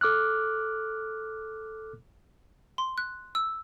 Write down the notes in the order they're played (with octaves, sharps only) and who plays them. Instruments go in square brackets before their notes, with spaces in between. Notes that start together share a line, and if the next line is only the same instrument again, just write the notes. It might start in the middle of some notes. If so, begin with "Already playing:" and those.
[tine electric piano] A4 D6 F6 F#6
[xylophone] C6
F#6
E6